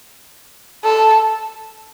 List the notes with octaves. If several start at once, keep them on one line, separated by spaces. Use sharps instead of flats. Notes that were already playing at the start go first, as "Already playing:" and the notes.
A4